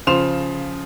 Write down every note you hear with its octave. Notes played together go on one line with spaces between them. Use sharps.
C#3 F3 C6 E7 F7